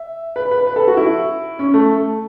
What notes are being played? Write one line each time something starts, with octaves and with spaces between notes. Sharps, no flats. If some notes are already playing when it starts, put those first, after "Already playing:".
Already playing: E5
B4
B4
B4
A4
F#4
E4
C#4
A3